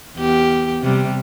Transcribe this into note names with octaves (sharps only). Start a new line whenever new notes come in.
E2 G4
C3 G3